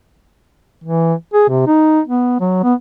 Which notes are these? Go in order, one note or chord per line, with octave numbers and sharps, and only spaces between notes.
E3
G#4
C3
D#4
B3
F#3
B3